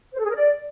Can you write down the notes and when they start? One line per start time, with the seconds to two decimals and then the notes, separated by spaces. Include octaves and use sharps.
0.13 C5
0.19 A4
0.24 G#4
0.30 A#4
0.35 D5